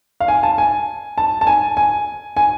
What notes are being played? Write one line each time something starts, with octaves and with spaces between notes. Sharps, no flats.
F5
G#5
A5
G#5
A5
A5
G#5
G#5
G#5